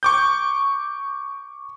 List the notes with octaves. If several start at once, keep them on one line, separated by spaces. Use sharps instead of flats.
C#6 D6 G6